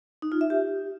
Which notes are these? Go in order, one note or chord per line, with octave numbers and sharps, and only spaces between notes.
D#4
F4
E5
G4